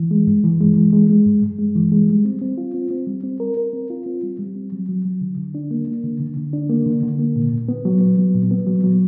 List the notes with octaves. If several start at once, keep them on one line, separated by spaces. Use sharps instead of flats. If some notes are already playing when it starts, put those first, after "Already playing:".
Already playing: E3
G#3
G2
E3
G#3
E3
G#3
G#3
G2
G2
G#3
E3
G#3
G3
C4
C4
F4
C4
C4
G3
C4
A#4
A#4
C4
F4
C4
G3
G3
C4
F#3
F#3
F#3
D3
D3
D4
A#3
A#3
D3
D3
D3
D4
A#3
D3
D3
A#3
A#2
A#2
B3
F#3
B3
F#3
A#2
B3
F#3
F#3